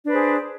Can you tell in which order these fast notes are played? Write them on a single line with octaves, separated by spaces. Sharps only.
D4 B4 C5 G#4